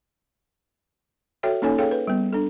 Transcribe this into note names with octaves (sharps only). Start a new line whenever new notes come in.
F#4 A4 C#5 E5 G5
A#3 C#4 D#4 A4 C#5 G#5
G#4 A4 C#5 F5 G5
B4
G3 B3
D4 A4